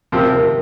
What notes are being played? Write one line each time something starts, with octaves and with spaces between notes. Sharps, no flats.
C3 F3 C4 G4 A#4
A#4